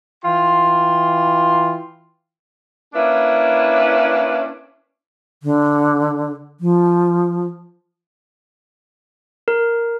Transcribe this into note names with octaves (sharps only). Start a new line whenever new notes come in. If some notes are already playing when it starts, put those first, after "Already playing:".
E3 F4 G5 C6
A#3 C#4 D4 E4 B4
D3
F3
A#4